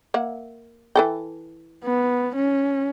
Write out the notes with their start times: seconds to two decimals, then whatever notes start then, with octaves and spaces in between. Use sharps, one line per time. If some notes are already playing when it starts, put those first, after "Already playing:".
0.14 A#3 E5 F#5
0.95 E3 A4 G5
1.84 B3
2.36 C#4